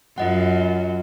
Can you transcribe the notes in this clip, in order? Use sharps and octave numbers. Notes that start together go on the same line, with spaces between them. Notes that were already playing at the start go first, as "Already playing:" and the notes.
F#2 F4 D#5 F#5